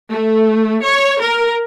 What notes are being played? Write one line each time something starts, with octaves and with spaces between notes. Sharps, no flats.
A3
C#5
A#4